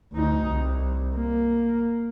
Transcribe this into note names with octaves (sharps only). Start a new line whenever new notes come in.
D2 D#4
C2
A#3